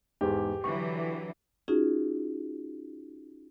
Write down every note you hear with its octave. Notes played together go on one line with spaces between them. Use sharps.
E2 G#2 G4
D3 E3 F#3 C#6
C#4 D#4 F4 F#4 G#4